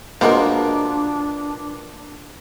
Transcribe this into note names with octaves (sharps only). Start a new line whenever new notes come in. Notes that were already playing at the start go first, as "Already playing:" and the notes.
A#2 F3 G#3 A#3 B3 D4 F#4 A#4